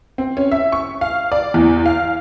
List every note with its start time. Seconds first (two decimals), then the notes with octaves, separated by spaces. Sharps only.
0.18 C4
0.37 C#4
0.52 E5
0.72 C#6
1.01 F5
1.32 D5
1.54 E2
1.86 F5